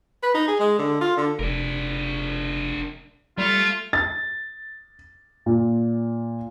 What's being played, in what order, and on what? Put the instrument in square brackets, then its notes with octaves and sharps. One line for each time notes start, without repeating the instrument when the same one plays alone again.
[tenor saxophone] B4
D#4
G#4
G#3
D3
F4
D3
[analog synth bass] F1 [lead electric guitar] D4 A#4
[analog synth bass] G3 [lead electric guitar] A3 [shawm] F4
[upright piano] A6
A#2